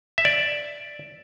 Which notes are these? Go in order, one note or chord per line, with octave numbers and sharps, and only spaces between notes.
E5
D5